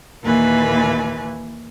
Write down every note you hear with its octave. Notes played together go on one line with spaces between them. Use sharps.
D#2 A#2 E3 B4 G#5